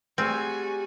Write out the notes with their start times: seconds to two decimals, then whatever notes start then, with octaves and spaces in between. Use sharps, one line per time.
0.18 G3 A3 C4 F#4 G#4 G#5 E6 F6